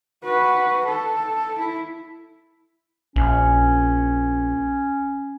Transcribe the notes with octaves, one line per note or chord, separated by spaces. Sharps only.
F#4 B4
A4
E4
A#1 C#4